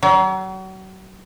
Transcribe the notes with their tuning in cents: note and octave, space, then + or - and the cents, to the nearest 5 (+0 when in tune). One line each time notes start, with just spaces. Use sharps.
F#3 +35